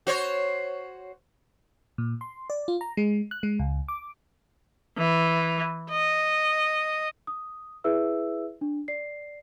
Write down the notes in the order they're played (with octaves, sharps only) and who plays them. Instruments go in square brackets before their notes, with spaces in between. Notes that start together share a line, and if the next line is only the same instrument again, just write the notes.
[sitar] F#4 C5 C#5
[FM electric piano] A#2
C6
D5
F4
A#5
G#3
F#6
G#3
C#2
D6
[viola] E3
D#5
[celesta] D#6
E4 G#4 B4 E5 E6
D4
D5 C7